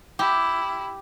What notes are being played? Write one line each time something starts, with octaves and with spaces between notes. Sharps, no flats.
E4 G4